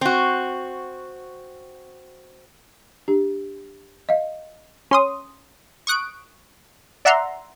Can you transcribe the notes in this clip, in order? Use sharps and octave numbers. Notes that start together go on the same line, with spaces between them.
C4 F#4
D4 G4
D#5 F5
C#4 C6 D#6
C#6 D#6 F#6 D7
D5 E5 F#5 A#5 C6